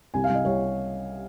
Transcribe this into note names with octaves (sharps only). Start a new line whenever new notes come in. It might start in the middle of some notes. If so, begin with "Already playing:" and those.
C2 G#5
F5
C2
D#5
C2 C#5